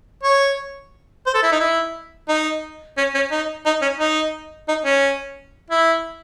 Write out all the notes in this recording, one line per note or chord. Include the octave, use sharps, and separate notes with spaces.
C#5
C5
A4
E4
D#4
E4
D#4
C#4
C#4
D#4
D#4
C#4
D#4
D#4
C#4
E4